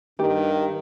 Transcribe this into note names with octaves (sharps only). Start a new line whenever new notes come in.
G2 D#3 D4 G4